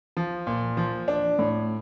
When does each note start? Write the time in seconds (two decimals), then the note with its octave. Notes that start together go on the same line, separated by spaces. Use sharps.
0.17 F3
0.47 A#2
0.77 F3
1.08 D4
1.39 A2